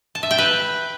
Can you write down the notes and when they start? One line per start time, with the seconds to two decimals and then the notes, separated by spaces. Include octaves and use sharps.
0.15 A5
0.23 E5
0.31 G5
0.38 B4